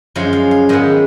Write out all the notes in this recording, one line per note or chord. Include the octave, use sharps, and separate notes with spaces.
F#2 F3 G#3 C#4 F5
F5
F5
G#2 D#3 G#3 B3 D#5